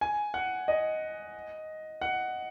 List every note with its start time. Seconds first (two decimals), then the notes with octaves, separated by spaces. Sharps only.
0.01 G#5
0.34 F#5
0.68 D#5
2.01 F#5